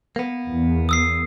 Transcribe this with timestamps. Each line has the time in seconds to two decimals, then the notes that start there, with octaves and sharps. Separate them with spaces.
0.16 A#3 B3
0.46 E2
0.89 D#6 E6 C7